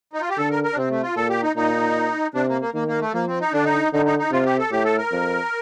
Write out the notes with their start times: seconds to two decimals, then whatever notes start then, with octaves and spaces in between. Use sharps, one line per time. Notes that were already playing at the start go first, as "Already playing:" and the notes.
0.13 D#4
0.21 F4
0.30 G4
0.37 D3 A4
0.51 A#4
0.64 A#4
0.72 D4
0.77 C3 C4
0.90 A3
1.03 F4
1.16 A#2 A4
1.29 G4
1.43 D#4
1.56 A#2 D#4
2.34 C3 D4
2.48 A#3
2.61 A#3
2.74 D#3 A#3
2.88 A#3
3.01 A3
3.13 F3 A#3
3.27 C4
3.41 D#4
3.52 D3 D4
3.64 D#4
3.93 D3 D#4
4.06 D#4
4.19 D#4
4.32 C3 F4
4.45 G4
4.59 A4
4.71 A2 G4
4.85 A4
4.98 A#4
5.11 F2